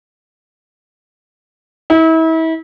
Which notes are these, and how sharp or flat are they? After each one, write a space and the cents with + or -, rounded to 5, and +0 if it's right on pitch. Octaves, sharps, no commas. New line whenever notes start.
E4 -35